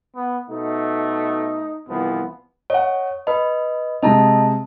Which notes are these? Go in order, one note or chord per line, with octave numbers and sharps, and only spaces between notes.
B3
B2 A3 D#4
C2 E3 F3 B3
C#5 D#5 F#5
B4 D#5 B5
C3 G#3 C4 D#5 A5 A#5